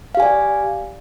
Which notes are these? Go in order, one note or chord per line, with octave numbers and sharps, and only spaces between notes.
G4 D5 F5 G#5